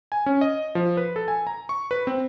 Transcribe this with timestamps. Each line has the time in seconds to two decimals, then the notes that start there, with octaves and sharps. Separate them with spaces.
0.12 G#5
0.26 C#4
0.41 D#5
0.75 F3
0.97 B4
1.16 A4
1.28 G#5
1.47 A#5
1.69 C#6
1.91 B4
2.07 C4